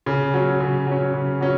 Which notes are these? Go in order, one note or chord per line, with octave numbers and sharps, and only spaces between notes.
C#3
F#3 C#4
C#3
F#3 C#4
C#3
F#3 C#4